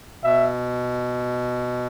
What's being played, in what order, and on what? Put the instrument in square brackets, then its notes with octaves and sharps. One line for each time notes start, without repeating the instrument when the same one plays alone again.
[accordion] B2 [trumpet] E5